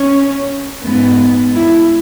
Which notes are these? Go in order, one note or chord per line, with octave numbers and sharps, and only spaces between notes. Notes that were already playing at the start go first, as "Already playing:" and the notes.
Already playing: C#4
G#2 G#3 B3
E4